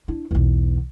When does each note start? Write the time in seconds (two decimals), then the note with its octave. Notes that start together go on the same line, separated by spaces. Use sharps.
0.08 D4 E4
0.31 B1 E2